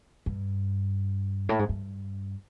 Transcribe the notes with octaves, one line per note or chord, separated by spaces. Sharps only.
G2
A2
G#2
G2